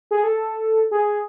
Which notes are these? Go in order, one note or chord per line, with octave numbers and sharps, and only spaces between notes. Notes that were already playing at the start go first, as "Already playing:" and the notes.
G#4
A4
G#4